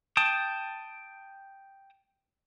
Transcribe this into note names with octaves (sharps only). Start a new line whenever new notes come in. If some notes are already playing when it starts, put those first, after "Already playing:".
G5 A5 D#6